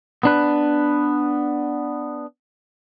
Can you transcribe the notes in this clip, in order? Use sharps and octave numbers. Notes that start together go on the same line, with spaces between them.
B3 D4 B4